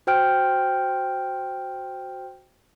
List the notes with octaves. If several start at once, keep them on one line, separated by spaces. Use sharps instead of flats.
F#4 C5 G5 F6 G6 D7